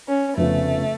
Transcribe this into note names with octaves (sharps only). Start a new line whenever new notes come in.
C#4
F1 F2 C#3 F3 A3 B3